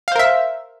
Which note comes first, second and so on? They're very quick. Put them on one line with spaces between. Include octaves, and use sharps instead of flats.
F5 C5 A#4 E5